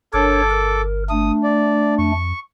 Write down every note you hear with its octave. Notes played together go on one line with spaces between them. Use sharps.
G1 D4 A4 A#4 C#5 D6
A#4
A3 D4 D#6
D5
F2 C#6